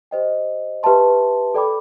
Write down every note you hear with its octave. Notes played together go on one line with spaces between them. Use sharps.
G4 C5 D#5 G5
G4 B4 E5 A5 C6
A4 D5 G5 B5 D6